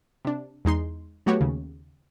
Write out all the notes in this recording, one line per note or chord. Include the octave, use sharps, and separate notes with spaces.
C3 D4
E2 G#3 D#4 C6
F#3 A3 B3 F#4 G4 C#5
D#2 C#3